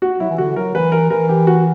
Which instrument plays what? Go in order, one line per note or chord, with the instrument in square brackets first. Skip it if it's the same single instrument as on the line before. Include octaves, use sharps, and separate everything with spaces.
[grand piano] F#4
[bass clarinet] F#3 [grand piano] E4
[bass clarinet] E3
[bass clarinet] D3 [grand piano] F#4
[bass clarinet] F#3 [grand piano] A#4
[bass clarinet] E3 [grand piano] B4
[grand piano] A#4
[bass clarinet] E3 [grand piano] A#4
[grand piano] G4
F#4